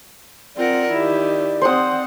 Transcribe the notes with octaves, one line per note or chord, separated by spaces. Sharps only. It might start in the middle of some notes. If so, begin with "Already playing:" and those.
C4 F4 A#4 D5 F#5
D#3 E4 G4
C4 C5 F#5 D#6